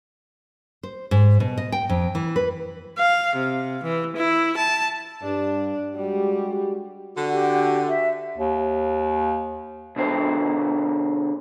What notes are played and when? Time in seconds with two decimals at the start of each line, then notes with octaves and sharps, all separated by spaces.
0.83 C5
1.11 G#2
1.40 B2
1.58 D#5
1.72 G5
1.89 F2
2.15 E3
2.36 B4
2.99 F5
3.37 C3
3.82 E3
4.17 E4
4.56 A5
5.23 G2 D4
5.96 G3 G#3 F#4 G4
7.16 D3 F#4
7.33 G4
7.89 E5
8.38 D#2
9.96 B2 D3 C5